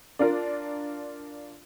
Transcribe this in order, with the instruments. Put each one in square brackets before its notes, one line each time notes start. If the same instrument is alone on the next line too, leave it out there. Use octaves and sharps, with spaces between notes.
[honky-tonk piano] D4 F4 A#4